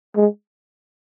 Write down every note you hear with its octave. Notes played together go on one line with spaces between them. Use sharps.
G#3